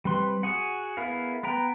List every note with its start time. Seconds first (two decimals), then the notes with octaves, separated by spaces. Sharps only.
0.05 G3 C4 B4 C6
0.43 F#4 G#4 F#5
0.97 B3 E4 G#4 A#4 F5
1.43 B3 B4 G5 A#5